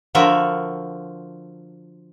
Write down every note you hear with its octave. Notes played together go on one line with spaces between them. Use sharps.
D3 F3 F#4 A#4 E5